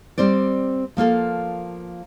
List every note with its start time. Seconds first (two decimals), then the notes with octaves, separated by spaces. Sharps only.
0.18 G3 C4 C5 D5
0.97 F3 A#3 F4 A4